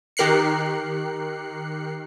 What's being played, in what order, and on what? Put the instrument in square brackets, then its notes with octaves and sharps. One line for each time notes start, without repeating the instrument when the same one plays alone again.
[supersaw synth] D#3 G4 A#4 F#6 C7 C#7